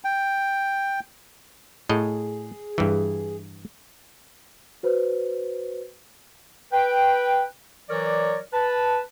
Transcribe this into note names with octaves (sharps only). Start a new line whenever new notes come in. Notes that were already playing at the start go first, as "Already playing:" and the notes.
G5
A2 G#4 D#5
G2 E3
F#4 B4 C5
B4 G5
E3 F#3 A#4 C#5 D5
B4 A5